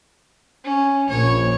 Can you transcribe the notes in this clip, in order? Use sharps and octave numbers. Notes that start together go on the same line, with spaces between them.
C#4
A#1 C#5